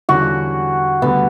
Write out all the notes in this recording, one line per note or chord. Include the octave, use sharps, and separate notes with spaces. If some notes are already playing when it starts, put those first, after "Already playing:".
E2 D3 G3 C#4 F#4 G4
D2 D3 G3 B3